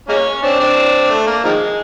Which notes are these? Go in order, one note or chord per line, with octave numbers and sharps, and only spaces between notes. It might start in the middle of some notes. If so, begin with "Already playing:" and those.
G#3 A#3 C#4
C4 D4
C4 D4
A3
A#3
D#3 F3 G#3